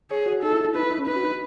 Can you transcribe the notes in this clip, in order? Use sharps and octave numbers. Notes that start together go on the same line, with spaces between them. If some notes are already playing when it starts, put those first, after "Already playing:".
G#4 C#5
F#4
D#4 A4
E4
E4
D#4 B4
E4
D#4
C#4
D#4 B4
F#4
D#4